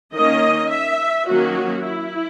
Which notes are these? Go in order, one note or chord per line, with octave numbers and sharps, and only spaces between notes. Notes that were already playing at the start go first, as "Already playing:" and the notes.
D#3 A#3 C#4 D#5
E5
D#3 F#3 A#3 C#4 F#4
E4